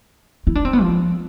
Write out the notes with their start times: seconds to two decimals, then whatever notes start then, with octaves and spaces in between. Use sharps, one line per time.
0.47 E4
0.55 D4
0.65 C4
0.73 B3
0.82 F3